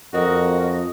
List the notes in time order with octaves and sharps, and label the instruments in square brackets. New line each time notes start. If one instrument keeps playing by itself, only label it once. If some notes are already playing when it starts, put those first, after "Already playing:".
[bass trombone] F2 [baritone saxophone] F#4 [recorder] A#4 [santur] D#5